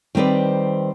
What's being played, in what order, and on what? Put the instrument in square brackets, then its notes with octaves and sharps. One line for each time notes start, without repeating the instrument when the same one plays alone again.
[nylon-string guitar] D#3 G3 C4 B4 D5